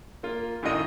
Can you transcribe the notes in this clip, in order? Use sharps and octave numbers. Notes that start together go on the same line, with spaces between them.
A#3 F4
F#2 A2 D#3 F4 D#5 D#7